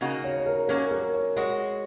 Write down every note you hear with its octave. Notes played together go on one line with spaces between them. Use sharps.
C#3 A#3 D#4 F#4
C#5
C#5
A#4
F#3 A#3 C#4 A#4
A#4
C#5
G#3 F#4 C#5